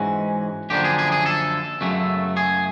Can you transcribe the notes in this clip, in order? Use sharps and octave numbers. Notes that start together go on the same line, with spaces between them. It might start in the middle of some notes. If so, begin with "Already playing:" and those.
Already playing: G#2 E3 G#3 C#4 F#4
F#2 D3 F3 A#3 D4 G4
G#4
G#4
G#4
A4
F#2 C#3 F#3 A3
G#4